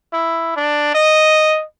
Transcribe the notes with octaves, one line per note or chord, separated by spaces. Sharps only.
E4
D4
D#5